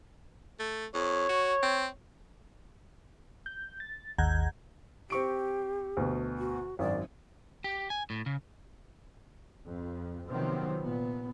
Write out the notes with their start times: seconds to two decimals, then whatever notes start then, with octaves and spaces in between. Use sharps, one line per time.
0.60 A3
0.94 F2 C#5
1.29 F#4
1.63 C4
3.46 G6
3.80 A6
4.18 G#1 D#2 F#5 A#5 G6 G#6
5.10 C4 G4 C#6 D7
5.97 D2 B2
6.38 F#4
6.79 G#1 F#2 D5
7.64 G4
7.90 G#5
8.10 A2
8.26 C#3
9.68 F2
10.30 C3 D#3 F3 F#3 B3 C4
10.82 A#2 B3